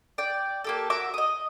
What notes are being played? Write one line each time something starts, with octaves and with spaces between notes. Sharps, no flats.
D5 G5
A#3 G4 A4
F#4 A#4 E5 D6
D#5 D#6